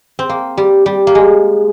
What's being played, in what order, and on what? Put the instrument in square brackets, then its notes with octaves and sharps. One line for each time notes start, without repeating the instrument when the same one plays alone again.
[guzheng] C4
A#3
G3
G3
A#3
G#3